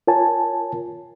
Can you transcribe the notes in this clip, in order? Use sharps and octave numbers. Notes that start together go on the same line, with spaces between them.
F4 A#4 C#5 G#5 A5